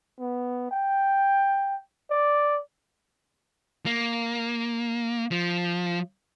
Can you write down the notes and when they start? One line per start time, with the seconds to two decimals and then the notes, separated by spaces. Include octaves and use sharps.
0.19 B3
0.71 G5
2.10 D5
3.86 A#3
5.31 F3